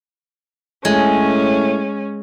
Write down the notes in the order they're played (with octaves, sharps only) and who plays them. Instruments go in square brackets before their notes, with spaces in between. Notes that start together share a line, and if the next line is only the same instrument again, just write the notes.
[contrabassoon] A2 [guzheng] G#3 [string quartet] C#4